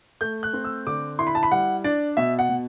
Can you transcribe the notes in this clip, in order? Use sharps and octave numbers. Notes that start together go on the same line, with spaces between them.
A3 G6
F#6
C4
E6
D3 D6
E4 C6
B5
A5
B5
G3 F#5
D4 D5
B2 E5
F#5
B2